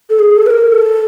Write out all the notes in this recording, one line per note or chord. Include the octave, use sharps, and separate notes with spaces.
A4
G#4
A4
B4
A#4
A4